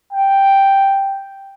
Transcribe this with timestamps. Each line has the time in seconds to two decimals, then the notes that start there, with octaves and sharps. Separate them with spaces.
0.13 G5